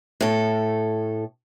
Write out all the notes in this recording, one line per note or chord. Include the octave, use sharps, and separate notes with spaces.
A2 A4